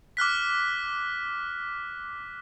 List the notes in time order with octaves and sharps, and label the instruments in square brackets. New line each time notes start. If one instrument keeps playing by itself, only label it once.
[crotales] D6 F6 F#6 B6